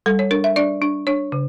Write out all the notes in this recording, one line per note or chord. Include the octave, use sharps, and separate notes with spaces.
G3 A4
C#5
D4 A#4
E5
D4 D5
D4
D4 C#5
C#3